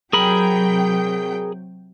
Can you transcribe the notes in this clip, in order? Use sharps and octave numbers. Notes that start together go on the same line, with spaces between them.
C3 F#3 G#4 A#4 G5 B5